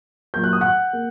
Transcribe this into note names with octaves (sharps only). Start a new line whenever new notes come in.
A#2 F#3 A#3 G6
F#6
D#6
F#5 F#6
A#3